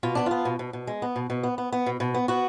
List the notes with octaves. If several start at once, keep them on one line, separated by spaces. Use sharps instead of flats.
B2 F4
B3 D4
B3 F4
B2
B2
B2
G#3
B3
B2
B2
B3
B3
B3
B2
B2
B3
B3 F#4